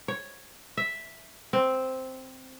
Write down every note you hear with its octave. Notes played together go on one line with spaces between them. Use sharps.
C#5
E5
C4